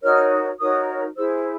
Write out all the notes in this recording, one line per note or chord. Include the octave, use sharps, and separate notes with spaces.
D#4 F#4 A#4 C#5 F6
D#4 F#4 A#4 C#5 D#6
E4 G#4 C5 E6